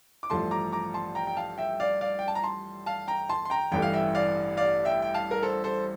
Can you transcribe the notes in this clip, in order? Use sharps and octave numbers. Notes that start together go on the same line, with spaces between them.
D6
A1 G2 F3 A3 A5 C6
A#5 D6
A#5 D6
A5 C6
G5 A#5
G5
F5 A5
E5 G5
D5 F5
D5 F5
G5
A5
A#5
A5 C6
F5 A5
G5 A#5
A5 C6
C6
G5 A#5
A1 G2 E3 A3 G5
F5
E5 G5
D5 F5
D5 F5
E5 G5
G5
F5 A5
A#4
A4 C5
A4 C5